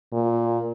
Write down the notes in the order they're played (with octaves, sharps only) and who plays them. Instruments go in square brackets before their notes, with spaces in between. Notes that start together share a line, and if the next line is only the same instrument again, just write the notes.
[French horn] A#2